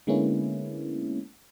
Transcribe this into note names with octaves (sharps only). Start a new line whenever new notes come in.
D3 G#3 A#3 B3 C#4 E4